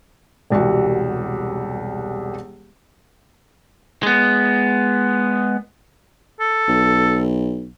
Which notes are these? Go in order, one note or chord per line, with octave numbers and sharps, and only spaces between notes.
E1 C2 G3 F#4
G#3 B3
A4
B1